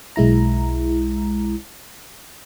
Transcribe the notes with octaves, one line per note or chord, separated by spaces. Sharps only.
B1 G#3 E4 A#5